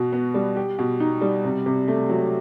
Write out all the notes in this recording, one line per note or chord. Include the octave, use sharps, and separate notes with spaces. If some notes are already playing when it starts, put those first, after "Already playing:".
Already playing: B2 F#4
B3
G3
G4
B2
D#4
G3
C3
C3
A3
F#3